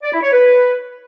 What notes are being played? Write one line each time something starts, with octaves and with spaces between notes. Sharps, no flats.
D5
E4
C#5
B4